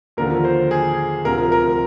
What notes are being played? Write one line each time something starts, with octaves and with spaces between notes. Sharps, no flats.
D#2 D3 F3 A#4
C5
G#4
D2 C3 F3 A#4
A#4